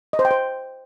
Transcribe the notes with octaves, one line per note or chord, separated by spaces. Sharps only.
D#5
C5
G5
C5